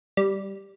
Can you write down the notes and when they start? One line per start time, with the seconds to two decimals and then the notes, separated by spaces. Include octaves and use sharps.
0.17 G3